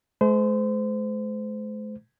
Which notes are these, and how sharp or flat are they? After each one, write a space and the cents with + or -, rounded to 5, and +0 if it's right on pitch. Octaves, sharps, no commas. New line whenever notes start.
G#3 +45 C5 -30